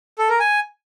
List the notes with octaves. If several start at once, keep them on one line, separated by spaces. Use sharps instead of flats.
A4
A#4
G#5